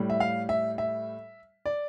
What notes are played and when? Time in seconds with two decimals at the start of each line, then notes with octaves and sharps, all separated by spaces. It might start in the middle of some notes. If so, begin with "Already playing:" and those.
Already playing: A2 G3
0.10 E5
0.20 F5
0.49 E5
0.78 E5
1.66 D5